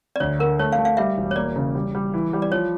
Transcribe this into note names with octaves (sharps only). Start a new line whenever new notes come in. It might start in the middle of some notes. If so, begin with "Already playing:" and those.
D5
D2 C#5
D3 A#4
A3 C#5
F5
A3
F5
G3 E5
E1
C#5
A#3 D5
C#3
G3
G3
E3
G3
D5
F3 C#5